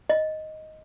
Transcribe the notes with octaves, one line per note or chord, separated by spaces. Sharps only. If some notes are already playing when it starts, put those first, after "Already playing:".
D#5